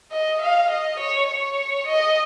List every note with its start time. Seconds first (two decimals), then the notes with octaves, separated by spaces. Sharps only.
0.12 D#5
0.41 F5
0.70 D#5
0.99 C#5
1.28 C#5
1.87 D#5